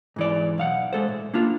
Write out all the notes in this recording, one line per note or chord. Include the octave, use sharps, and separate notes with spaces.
G#2 E3 D5
B1 F5 F#5
G#3 A4 C5
A2
A#3 D4 F4